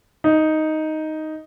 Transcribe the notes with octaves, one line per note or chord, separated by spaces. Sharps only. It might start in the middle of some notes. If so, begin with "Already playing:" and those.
D#4